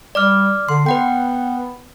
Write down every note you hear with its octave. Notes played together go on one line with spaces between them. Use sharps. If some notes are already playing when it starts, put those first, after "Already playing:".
G3 D5 D6 F6
D3 C6
B3 B4 F#5 G5